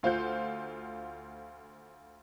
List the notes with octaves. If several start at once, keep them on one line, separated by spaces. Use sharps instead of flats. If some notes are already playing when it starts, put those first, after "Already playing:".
D2 F4 C5 F#5 G6